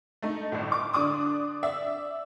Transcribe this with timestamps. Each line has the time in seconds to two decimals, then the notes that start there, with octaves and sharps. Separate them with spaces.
0.22 A3 D#4
0.52 G1 A2
0.72 D6
0.93 D3 D4 D6 D#6
1.63 D5 E5